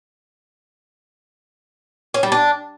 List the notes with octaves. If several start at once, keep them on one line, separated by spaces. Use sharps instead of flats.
C#4
G3
D4